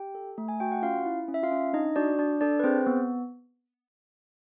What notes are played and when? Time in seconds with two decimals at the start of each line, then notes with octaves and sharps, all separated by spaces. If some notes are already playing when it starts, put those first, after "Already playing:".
Already playing: G4 G5
0.15 A4
0.38 A3
0.49 G#5
0.60 F#4 G5
0.72 F#5
0.82 C#4 F4 F5
1.05 E4
1.28 C#4
1.34 E5
1.43 F4 F5
1.51 C#4
1.73 D4 D#4 D#5
1.96 D4 F#4 D5
2.19 D4 D5
2.41 D4 A4 D5
2.59 B4
2.64 C4 G#4 C5
2.86 B3